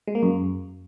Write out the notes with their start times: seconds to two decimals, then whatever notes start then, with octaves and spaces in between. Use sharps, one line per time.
0.07 G#3
0.15 A#3
0.23 F#2